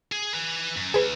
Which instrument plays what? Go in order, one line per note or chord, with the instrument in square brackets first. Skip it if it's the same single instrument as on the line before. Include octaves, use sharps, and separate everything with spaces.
[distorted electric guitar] G#4
B4 G#5
F#2
[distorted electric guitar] D2 [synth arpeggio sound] G#4 B4